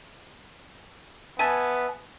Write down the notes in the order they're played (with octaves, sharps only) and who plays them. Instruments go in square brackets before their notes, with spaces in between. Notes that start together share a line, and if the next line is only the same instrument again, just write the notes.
[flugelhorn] B3 [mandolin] E5 G#5 A5